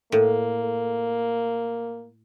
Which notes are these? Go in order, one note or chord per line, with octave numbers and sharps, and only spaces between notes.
A2 A#3